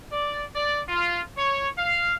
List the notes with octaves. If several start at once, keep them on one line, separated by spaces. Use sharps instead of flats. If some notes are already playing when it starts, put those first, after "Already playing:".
D5
D5
F4
C#5
F5